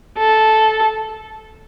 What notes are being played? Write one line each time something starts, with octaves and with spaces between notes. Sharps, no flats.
A4